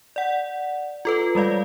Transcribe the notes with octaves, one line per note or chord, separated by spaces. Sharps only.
D5 F#5
F4 A4 B4
G3 G#3 D5 F5